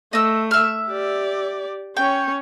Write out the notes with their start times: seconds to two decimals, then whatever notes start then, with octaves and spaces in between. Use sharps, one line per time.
0.13 A3 D#5 E6
0.51 E5 F6
0.88 G4 D5
1.97 C#4 C#5 G5